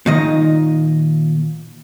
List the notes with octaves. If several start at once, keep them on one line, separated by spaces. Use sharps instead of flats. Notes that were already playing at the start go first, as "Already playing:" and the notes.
A#2 D#3 D#5